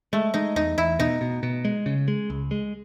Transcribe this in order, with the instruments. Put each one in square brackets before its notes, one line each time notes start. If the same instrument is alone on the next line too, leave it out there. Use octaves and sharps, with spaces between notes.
[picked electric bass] G#3 [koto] A3
[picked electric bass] G#3 [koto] D#4
[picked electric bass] E2 [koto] D#4
[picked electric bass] E2 [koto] E4
[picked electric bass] B2 [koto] D#4
[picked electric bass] B2
B2
G#3
C#3
G#3
C#2
G#3